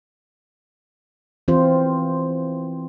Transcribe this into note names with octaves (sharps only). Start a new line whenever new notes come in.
E3 C4 F4 C5